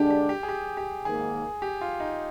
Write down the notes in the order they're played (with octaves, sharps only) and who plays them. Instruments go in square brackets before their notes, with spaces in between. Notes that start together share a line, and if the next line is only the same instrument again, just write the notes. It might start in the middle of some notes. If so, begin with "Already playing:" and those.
Already playing: [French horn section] D3 G#3 D4 [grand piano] G4
[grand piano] G4
G4
G#4
G4
G4
[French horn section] G#2 D#3 A#3 [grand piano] G#4
[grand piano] G4
F4
D#4